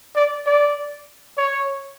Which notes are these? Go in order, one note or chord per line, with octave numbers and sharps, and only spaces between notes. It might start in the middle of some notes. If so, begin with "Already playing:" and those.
D5
D5
C#5